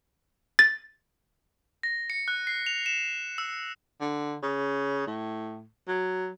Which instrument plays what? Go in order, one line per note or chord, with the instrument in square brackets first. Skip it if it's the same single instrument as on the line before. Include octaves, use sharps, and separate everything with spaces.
[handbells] A6
[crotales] A#6
C#7
F#6
C7
F7
E7
E6
[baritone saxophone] D3
C#3
A2
F#3